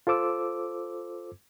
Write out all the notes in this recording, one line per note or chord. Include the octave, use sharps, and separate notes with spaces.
F4 A4 C5 D6 E6